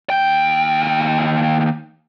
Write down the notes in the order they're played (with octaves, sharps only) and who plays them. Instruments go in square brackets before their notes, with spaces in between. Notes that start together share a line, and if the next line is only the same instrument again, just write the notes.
[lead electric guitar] D#2 G5